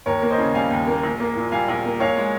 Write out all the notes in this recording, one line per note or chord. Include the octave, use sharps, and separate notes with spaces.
D#2 A#4 C#5
A#3
C5 D#5
C#3
G3 F5 G#5
D#2
A#3
A#1
A#3
A#2
G3 F5 G#5
A#1
A#3
A#1 C#5 F5
G#3